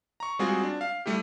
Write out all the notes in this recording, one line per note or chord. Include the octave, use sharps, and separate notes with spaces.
A#5 C#6
G3 G#3 C4 F4 F#4 G#4
D4
F5
G3 A3 E4 G4